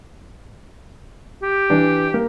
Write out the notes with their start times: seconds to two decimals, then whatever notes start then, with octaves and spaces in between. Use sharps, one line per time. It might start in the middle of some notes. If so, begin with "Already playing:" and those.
1.42 G4
1.70 E3 D4
2.14 A#3